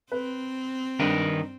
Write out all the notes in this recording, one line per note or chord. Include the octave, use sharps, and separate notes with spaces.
C4 B4
G2 D#3 A#4 B4